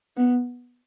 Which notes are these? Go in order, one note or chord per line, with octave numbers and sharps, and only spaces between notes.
B3